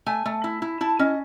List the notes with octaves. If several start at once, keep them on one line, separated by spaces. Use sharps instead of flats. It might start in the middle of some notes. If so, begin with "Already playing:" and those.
A3 G#5
A3
E4
E4
E4 A5
C#4 D#5